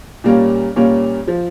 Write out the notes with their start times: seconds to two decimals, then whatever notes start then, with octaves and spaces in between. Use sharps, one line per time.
0.24 A#2 G3 A#3 C#4
0.76 A#2 G3 A#3 C#4
1.28 F3